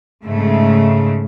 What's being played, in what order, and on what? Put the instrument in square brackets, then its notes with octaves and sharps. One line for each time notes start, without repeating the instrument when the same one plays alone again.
[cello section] G#2 C#3 A3